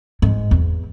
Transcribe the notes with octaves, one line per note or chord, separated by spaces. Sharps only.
G#2
E2